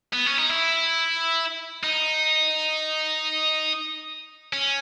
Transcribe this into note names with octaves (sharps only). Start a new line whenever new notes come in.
B3
C#4
D#4
E4
D#4
C#4